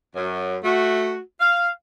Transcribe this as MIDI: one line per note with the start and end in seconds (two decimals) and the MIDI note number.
0.16 0.57 42
0.64 1.19 57
0.64 1.19 66
1.41 1.69 77